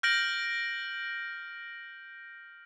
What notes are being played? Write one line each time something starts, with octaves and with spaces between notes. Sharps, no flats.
F6 G6 A#6 D7 F#7